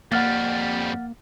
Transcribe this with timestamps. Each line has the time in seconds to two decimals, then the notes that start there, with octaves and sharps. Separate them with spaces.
0.12 F2 G3 A#3 F#5 F6 A6